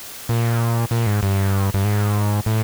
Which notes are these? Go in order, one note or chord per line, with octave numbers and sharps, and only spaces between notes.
A#2
A#2
G#2
G2
G2
G#2
A2